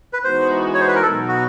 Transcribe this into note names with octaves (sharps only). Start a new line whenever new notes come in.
B4
E3 G#3 B3 D#4 F#4 C5
C#5
C5
B4
A#4
B2 F#3 B3 D#4 A4
F#4